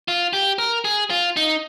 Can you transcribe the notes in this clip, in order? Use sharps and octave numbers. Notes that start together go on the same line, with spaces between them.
F4
G4
A#4
G#4
F4
D#4